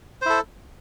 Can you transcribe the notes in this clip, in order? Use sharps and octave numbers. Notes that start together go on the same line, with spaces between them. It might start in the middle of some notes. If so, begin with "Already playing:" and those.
E4 A4 C5